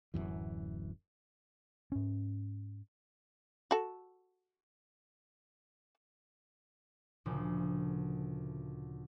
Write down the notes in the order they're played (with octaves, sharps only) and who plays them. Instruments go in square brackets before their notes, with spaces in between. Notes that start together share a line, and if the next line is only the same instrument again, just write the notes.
[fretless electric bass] D1 C2 F#2 E3
[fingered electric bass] G#2 C#4
[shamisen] F#4 A4
[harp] D2 A#2 C#3 F3